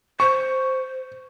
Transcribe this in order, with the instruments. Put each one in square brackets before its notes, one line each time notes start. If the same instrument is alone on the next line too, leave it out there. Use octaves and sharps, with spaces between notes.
[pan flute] C5 [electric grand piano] C#6